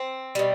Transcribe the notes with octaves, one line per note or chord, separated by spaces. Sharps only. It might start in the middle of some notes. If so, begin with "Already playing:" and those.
Already playing: C4
B2 G3